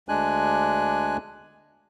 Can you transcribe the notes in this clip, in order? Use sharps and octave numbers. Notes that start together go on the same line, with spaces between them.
D2 G#3 D4 G#5 F#6